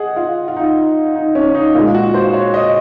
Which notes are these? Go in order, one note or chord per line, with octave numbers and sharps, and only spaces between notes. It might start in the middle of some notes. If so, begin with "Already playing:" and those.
Already playing: G#4 D#5 F#5
F4
F4
D#4
D#4
C#4
D#4
A#2 G#3 F4
F#4
C5
C#5
D#5